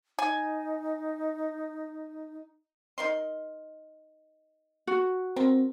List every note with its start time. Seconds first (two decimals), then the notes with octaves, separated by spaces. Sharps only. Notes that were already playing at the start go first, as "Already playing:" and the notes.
0.19 D#4 G#5
2.98 D#4 A#4 C6
4.87 F#4
5.36 C4 A#4